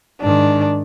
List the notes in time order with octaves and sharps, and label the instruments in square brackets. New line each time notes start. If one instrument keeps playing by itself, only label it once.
[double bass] G#2 D#3 [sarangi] D4